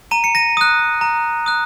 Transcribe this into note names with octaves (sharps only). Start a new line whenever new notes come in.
A#5 D#7
C#7
A#6 D#7
D#6 F#6
A#5
D#6 F#6